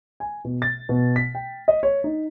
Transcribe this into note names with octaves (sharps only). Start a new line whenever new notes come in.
G#5
B2
A6
B2
B6
G5
D#5
C#5
D#4